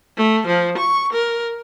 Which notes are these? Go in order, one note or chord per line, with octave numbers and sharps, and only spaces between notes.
A3
F3
C#6
A#4